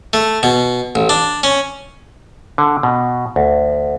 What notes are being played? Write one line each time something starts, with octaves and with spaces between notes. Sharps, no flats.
A3
B2
A1
D4
C#4
D3
B2
D2